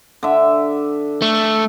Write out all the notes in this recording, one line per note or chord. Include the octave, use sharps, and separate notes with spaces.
D3 E5
A3